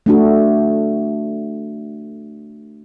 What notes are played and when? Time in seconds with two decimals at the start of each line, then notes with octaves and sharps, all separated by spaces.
0.06 A3 D4 F#4